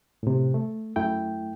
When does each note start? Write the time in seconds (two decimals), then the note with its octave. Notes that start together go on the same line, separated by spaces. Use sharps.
0.23 A2 C3
0.54 A3
0.96 F#2 A3 E4 G5